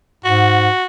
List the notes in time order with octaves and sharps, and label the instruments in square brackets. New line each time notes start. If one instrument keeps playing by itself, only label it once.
[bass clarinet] G#2 [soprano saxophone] F#4